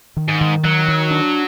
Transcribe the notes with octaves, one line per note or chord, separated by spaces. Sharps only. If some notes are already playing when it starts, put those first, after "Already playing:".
D#3
G#2
D#3
D#3 F#3
D#3
D4